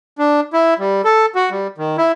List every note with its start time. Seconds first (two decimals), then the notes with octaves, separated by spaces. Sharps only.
0.18 D4
0.53 E4
0.79 G3
1.04 A4
1.35 F#4
1.51 G3
1.78 D#3
1.98 E4